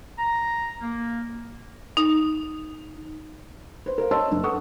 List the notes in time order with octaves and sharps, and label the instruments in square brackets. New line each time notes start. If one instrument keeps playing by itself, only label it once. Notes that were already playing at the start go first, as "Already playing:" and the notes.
[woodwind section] A#5
A#3
[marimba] D#4
[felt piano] B4 C5
A#4 C5 F5
C#5 D#5 A5 C6 E6
F#1 D4
A4 B4 F#5 C#6 D#6